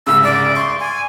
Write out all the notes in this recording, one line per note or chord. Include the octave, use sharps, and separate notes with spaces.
C2 G#2 C#3 E6
D5
C6 C#6
G#5